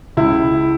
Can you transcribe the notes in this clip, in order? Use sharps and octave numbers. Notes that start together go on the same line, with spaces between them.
C#2 E4